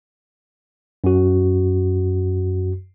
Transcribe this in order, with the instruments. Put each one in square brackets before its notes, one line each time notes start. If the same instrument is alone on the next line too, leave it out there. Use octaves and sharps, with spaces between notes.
[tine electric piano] F#2 F#4